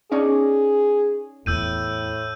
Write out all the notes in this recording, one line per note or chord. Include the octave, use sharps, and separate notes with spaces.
C#4 D#4 G#4 D5
E2 A2 B3 E6 G6 D#7